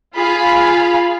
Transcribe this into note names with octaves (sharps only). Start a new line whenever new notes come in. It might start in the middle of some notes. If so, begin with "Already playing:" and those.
F4 G#4 F5 B5